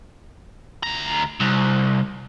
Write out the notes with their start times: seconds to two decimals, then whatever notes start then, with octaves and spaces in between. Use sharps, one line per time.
0.83 D2 A#5
1.41 C2